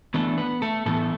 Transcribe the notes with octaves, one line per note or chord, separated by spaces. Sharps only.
E3 A3 B3 D4 A4
B3 B4
A3 A4
A2 E3 A3 B3 A4